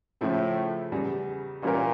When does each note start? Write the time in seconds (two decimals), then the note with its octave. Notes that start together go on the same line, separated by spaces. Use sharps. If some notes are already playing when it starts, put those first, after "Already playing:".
0.21 A2 C#3 F3 A3 E4
0.92 E2 C#3 G3
1.62 A#2 E3 G3 C#4 G4 A#4